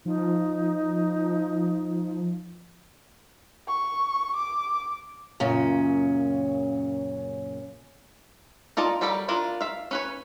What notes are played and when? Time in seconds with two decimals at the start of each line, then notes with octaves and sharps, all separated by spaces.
0.05 F3 D#4
3.68 C#6
4.36 D6
5.40 F#2 A#2 C#3 C#4
8.77 D#4 F4 D5 A5
9.01 F#3 G3 A4 A#4 B5
9.28 D4 E4 F4 A#4 D5
9.61 E5 F5
9.91 C#4 B4 C#5